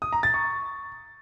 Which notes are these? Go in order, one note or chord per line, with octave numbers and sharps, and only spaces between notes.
D#6
A#5
A6
C#6